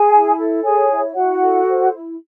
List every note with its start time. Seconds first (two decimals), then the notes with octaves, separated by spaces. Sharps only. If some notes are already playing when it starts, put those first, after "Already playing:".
Already playing: G#4 G#5
0.13 E4
0.39 A4
0.64 G#4 C#5 G#5
0.90 E4
1.16 E4 F#4 F#5
1.42 A4
1.67 C5
1.93 E4